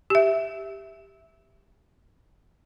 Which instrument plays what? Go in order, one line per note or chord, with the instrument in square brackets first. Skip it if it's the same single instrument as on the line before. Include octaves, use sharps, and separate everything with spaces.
[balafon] G4 E5